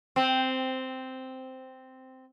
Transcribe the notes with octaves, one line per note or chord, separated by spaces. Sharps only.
C4